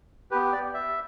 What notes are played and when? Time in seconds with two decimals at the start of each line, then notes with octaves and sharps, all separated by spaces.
0.31 B3 G4 B4
0.53 D5
0.74 E5